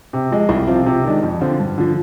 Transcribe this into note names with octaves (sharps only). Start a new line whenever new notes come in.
C3
F3 G#3
C2
C3 F3 C4 F4
C3
D#3 G#3 D4
F2
D3 F3 C4 F4
G2
D3 F3